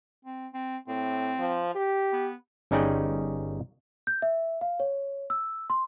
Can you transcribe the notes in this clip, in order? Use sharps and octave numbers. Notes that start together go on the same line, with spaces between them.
C4
C4
A2 C4
F3
G4
B3
G1 C#4 D#4 G#4 D5 G5
G6
E5
F5
C#5
E6
C6